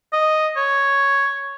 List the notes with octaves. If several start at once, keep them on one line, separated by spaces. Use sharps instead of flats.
D#5
C#5